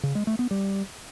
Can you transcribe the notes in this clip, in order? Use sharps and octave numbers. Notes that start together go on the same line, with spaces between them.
C#3
G#3
A3
B3
G3